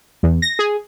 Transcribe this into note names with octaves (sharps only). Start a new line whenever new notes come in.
E2
A#6
G#4